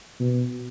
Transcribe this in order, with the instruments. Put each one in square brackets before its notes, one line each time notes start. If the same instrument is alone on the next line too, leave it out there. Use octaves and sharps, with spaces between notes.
[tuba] B2